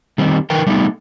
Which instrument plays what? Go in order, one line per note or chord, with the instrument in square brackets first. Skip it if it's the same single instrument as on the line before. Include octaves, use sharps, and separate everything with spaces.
[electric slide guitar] D#3 G3 C4
D#3 A#4 B4 G5
G3 A3 B3 D#4